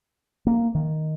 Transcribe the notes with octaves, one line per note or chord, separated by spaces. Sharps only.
A#3
D#3